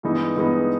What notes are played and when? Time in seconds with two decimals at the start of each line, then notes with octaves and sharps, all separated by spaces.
0.03 G2 E3 G#3 B3 D#4
0.36 G2 E3 G#3 B3 D#4